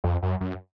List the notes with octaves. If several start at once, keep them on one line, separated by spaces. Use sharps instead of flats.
F2
F#2
F#2